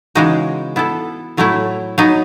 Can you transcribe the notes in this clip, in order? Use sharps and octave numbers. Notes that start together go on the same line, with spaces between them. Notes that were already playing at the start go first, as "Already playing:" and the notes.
C#3 E3 G#3 D#4 F#4
B3 E4 A4
A2 F#3 A3 E4
F#3 B3 D#4